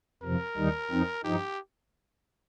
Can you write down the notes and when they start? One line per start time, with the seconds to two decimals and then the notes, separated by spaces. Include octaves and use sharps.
0.23 F2 C3 F3 A#4
0.57 D#2 D#3 G3 D#4
0.91 F2 F3 C4 D#4
1.24 G2 F3 D#4 G4